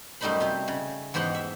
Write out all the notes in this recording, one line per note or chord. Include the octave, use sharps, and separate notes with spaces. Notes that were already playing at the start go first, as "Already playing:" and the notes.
F#2 G3 A3 D#4 C5 B5
C3 C4
C#3
E2 G#2 G4 C5 F#5
E5